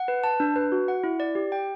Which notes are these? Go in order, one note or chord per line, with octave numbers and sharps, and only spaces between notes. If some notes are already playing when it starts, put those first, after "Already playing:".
Already playing: F#5
B4
A5
D4
B4
F#4
F#5
E4
D5
G4
G5